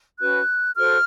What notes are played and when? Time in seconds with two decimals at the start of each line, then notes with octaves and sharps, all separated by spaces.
0.19 C#4 F#4 B4 F#6
0.76 F#4 A4 C5 F6